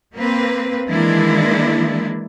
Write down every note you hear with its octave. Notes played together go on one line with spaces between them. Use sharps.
A#3 C4 B4
D#3 E3 G#3 A#3 D4 E4